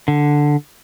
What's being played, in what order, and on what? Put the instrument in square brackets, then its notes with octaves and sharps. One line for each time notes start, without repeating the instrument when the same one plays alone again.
[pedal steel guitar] D3